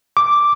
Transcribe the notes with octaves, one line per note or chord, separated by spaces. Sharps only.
D6